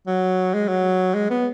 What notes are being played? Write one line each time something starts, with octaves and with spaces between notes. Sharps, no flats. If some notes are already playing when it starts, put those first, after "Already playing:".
F#3
G#3
F#3
G#3
B3